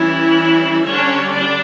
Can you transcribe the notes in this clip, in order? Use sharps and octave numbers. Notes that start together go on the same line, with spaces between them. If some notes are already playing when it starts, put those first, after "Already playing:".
Already playing: E3 G3 C#4 E4
D3 G3 C#4 D4 C#5
D4 D5